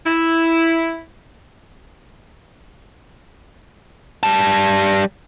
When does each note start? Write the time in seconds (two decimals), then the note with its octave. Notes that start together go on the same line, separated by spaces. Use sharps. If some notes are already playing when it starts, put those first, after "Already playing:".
0.06 E4
4.23 G3 A5